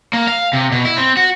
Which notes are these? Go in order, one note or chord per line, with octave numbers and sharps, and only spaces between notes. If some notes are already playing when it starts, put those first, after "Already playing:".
A#3
F5
C3
B2
E4
C4
F#4